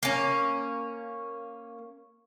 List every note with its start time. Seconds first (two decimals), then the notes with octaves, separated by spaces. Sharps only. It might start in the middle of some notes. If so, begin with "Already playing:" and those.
0.03 A#3 C#4